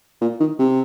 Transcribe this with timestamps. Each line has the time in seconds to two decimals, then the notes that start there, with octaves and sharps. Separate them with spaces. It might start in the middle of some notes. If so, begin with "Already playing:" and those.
0.21 A#2
0.40 D#3
0.59 C3